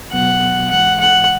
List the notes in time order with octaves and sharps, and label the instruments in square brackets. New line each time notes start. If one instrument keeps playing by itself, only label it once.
[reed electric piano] C#2 B2 F#3 B3 [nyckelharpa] F#5
[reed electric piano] G#2 E3 G#3 [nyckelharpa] F#5
[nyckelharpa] F#5